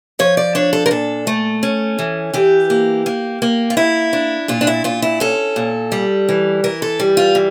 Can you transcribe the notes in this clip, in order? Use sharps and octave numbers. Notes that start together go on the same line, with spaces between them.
F3 C#5
D5
D4 C#5
A4
A#4
A#2 A4
A3
C#4
E3
E3 G4
A#3
A#3
A#3
F4
A#3 E4
D4
A#2 F4
D4
E4
A#2 F4
E4
C#4 A4
A#2
G3
E3
E3 A#4
A4
G3
F4
E3